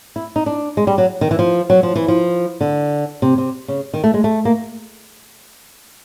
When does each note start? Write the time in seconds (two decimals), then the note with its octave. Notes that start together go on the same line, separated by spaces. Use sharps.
0.16 E4
0.36 D#4
0.46 D4
0.77 G#3
0.87 G3
0.98 F#3
1.21 D#3
1.31 E3
1.39 F3
1.70 F#3
1.83 F3
1.96 E3
2.08 F3
2.61 D3
3.22 C3
3.38 C3
3.68 C#3
3.94 D#3
4.04 A3
4.14 G#3
4.24 A3
4.45 A#3